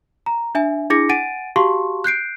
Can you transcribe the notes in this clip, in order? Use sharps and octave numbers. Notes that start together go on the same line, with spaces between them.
A#5
D4 E5 G#5
D4 E4 G#4 D6 A#6 C#7
F#5 G#5 A6 D7 D#7
F#4 G4 F5 A5 C6 C#6
F#6 G6 C7 D7